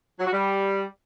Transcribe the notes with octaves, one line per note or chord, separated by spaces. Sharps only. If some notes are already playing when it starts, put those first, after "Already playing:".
F#3
F#4
G3